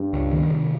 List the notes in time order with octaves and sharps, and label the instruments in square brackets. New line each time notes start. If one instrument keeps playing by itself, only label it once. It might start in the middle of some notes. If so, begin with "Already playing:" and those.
Already playing: [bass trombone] G2
[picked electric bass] C#2
D#3
C3